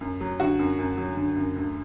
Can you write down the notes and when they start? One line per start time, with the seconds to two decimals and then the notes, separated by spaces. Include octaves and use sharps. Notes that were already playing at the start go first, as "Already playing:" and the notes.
0.01 F#2
0.20 F#3
0.40 D3 F#4
0.59 F#2
0.79 F#2
0.97 F#3
1.17 D3
1.36 F#2
1.56 D2